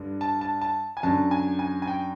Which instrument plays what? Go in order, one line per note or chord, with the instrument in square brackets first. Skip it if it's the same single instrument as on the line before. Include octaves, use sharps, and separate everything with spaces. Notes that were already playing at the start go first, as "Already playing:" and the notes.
Already playing: [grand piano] G2 D3
A5
A5
A5
G#5
F#2 D3 A5
G#5
G#5
G#5
G5